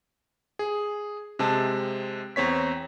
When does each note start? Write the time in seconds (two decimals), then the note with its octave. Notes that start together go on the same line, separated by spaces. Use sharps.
0.59 G#4
1.39 C3 G#3 C4 A5
2.36 E2 C4 C#5 B6